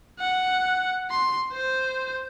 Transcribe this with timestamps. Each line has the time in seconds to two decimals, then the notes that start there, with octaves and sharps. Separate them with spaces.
0.19 F#5
1.10 C6
1.52 C5